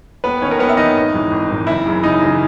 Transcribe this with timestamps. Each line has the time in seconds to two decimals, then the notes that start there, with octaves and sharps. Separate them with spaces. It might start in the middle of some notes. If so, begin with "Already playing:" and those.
0.24 D#2 B3 B4
0.41 D#3 C#4 C#5
0.51 A#4
0.59 D#2 B3 B4
0.69 E5
0.77 D#3 D#4 D#5
0.96 G#1
1.14 G#2 E3
1.31 G#1
1.49 G#2 E3
1.67 F#1 E4 E5
1.86 F#2 C#3 E3
2.03 F#1 D#4 D#5
2.21 F#2 C#3 E3